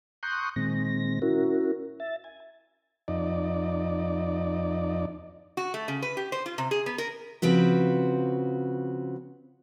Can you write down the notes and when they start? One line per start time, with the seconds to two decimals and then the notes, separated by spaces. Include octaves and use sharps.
0.23 A#5 C6 C#6 D#6 F#6 G6
0.56 A#2 D#3 G#3 C4 A#6
1.22 C#4 E4 F#4 A#4
2.00 E5 A6
2.24 G#5
3.08 F2 D#4 D5
5.57 F#4
5.74 A3
5.88 C#3
6.02 B4
6.17 G4
6.32 C5
6.46 F4
6.58 C3
6.71 G#4
6.86 B3
6.98 A#4
7.42 C#3 F3 C4 F#4 B4